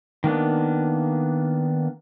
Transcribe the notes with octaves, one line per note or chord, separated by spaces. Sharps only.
D#3 A#3 B3 D4